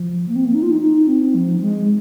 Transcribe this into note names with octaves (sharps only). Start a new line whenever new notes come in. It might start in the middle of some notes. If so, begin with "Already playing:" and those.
Already playing: F3
A#3
C4
A#3
D#4
F4
D#4
D#4
C4
F3
G#3